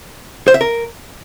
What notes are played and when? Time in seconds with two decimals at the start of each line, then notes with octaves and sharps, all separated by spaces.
0.48 C5
0.54 E5
0.61 A#4